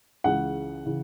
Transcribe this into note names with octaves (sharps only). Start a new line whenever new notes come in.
C#2 C#3 E3 F#5
C#3 E3